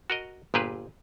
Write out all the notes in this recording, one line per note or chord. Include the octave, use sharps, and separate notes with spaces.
F#4 A#4 D#5
G1 A#2 G4 G#4 B4